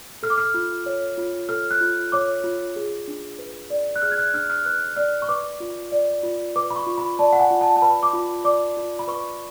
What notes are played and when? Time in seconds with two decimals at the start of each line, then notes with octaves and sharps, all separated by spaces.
0.23 A4 F6
0.30 D6
0.38 F6
0.54 F4
0.86 C#5
1.18 F4
1.49 A4 F6
1.71 F#6
1.81 F4
2.12 C#5 D6
2.44 F4
2.76 G#4
3.08 D4
3.39 B4
3.70 D5
3.96 F#6
4.02 G#4 F6
4.12 G#6
4.18 F#6
4.33 D4 F6
4.50 F6
4.65 B4 F#6
4.97 D5 F6
5.22 C#6
5.29 B4 D6
5.60 F4
5.92 D5
6.23 F4
6.56 B4 D6
6.70 B5
6.76 C#6
6.86 F4
6.98 B5
7.19 D5 A5
7.33 F#5
7.39 G#5
7.51 F4
7.61 A5
7.76 A5
7.82 B4 B5
8.03 D6
8.13 F4
8.44 D5 D6
8.77 F4
8.99 B5
9.07 B4 C#6